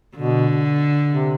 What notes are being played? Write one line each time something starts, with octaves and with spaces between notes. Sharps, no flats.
B2 D3
C3